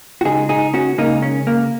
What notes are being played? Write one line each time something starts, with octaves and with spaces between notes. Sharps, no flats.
F#4
C#3 G#3 D#4 G#4
D#4 G#4
C#4 F#4
C#3 G#3 A#3 D#4
C#4
A#3